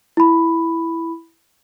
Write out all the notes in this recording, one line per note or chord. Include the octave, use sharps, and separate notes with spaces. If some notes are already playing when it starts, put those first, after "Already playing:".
E4 B5